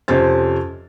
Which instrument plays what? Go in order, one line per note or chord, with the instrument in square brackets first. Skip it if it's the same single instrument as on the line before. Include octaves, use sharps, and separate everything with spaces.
[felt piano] F2 C3 C#4 C5 A6